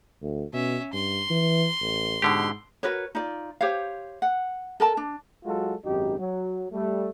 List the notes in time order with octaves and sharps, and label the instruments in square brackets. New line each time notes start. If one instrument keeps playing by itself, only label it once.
[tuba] D2
[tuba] B2 [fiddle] C#4 E5
[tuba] G2 [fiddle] C6
[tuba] E3
A1
[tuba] G#2 [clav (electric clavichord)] B2 D3 G4
[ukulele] F#4 A#4 B4 C#5
D#4 F4 D5
G4 C5 C#5 F5
F#5
A4 A#4 A5
D4
[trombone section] F#3 G#3 F4 F#4 A4
G#1 F#2 D#4 G4
F#3
G3 A3